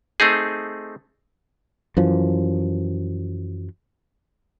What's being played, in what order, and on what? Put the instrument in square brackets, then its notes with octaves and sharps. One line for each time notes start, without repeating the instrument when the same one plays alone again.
[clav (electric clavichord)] A3 C4 D#4 G#4
[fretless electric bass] F#2 E3 F3